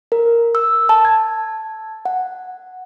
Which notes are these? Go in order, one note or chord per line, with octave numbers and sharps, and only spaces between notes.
A#4
E6
A5
G#6
F#5